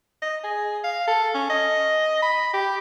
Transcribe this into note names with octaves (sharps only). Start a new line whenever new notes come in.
D#5
G#4
F5
A4
C#4
D#5
B5
G4